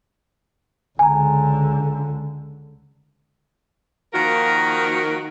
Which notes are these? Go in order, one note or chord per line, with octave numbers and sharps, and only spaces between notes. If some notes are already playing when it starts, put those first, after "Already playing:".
C#2 D3 G#5 A#5
D#3 F3 A#3 F#4 A#4